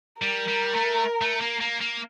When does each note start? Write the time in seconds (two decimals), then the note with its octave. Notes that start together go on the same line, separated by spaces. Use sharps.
0.22 G3 A#4
0.48 G3
0.75 A3
1.21 A3
1.41 A#3
1.61 A#3
1.81 A#3